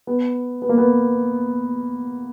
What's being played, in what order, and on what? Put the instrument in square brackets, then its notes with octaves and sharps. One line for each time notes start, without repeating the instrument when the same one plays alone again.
[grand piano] B3
B3
A#3
B3